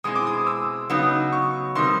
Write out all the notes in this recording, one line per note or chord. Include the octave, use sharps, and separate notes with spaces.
B2 G#3 C4 E4 D#6
D6
D#6
E6
C#3 F#3 B3 D#4
C#6
C3 D#3 G3 C6